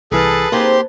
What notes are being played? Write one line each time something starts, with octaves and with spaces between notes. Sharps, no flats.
C2 E3 G#4 A4 B4 A5 F6
A#3 C4 D#4 G4 G#4 C6